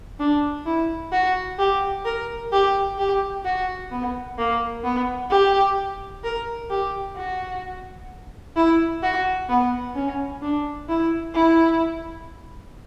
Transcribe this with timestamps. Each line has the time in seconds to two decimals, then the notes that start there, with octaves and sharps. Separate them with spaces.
0.19 D4
0.66 E4
1.12 F#4
1.59 G4
2.05 A#4
2.52 G4
2.98 G4
3.45 F#4
3.91 B3
4.38 A#3
4.84 B3
5.30 G4
6.24 A#4
6.70 G4
7.16 F#4
8.56 E4
9.02 F#4
9.49 B3
9.95 C#4
10.42 D4
10.89 E4
11.34 E4